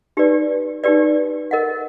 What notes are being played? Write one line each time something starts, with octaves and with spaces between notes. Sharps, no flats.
D#4 G4 B4 D5
D#4 G4 B4 D5
A#4 D#5 F#5